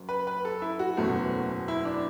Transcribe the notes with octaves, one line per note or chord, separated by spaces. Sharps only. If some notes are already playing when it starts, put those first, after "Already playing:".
Already playing: F#1 F#2 F#3
B4
B4
A4
E4
F#4
F#1 E2 B2 F#3 A3
E4
D4